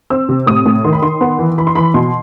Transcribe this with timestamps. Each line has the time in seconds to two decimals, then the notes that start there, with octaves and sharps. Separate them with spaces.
0.10 C4 E6
0.29 C3
0.47 A2 D#6
0.66 A2
0.84 D#3 C6
0.93 B5
1.02 D#3 C6
1.21 B3
1.39 E3
1.58 E3 B5
1.67 C6
1.75 E3 B5
1.94 B2 C6